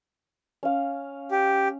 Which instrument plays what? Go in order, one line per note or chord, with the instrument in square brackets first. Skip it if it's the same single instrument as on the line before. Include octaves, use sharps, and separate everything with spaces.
[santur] C#4 F5
[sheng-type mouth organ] G4